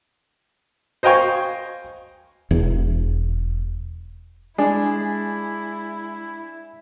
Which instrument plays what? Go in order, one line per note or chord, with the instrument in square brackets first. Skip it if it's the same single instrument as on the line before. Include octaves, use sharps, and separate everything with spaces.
[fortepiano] C5 D#5 F5 G5 G#5 C#6
[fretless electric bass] E1 E2
[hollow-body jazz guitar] G#3 [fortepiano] D4 [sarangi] E4 [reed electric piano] G#5